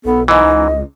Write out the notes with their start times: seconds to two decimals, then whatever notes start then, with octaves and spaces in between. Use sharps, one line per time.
0.05 B1 B3 A4
0.28 G#2 E3 D#4 D#5
0.43 C#2